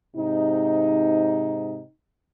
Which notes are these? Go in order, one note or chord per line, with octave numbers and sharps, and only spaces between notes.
G#2 C3 D#4